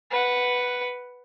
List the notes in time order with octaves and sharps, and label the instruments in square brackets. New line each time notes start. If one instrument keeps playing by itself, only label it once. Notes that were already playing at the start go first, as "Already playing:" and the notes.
[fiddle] B4 F#5